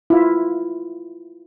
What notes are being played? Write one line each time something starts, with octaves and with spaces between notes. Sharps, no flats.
E4 F4